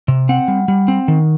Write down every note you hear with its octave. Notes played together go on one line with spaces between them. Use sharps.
C3
C4 F#5
G3
G3
C4
D#3